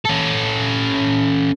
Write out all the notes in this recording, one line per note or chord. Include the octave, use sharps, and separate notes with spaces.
C#4 A4